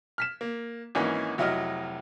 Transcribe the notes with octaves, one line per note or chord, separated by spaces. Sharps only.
F6 B6 E7
A#3
G#1 E3 A#3 C#4 D#4
F1 F#3 E4 D#5 D#6 F6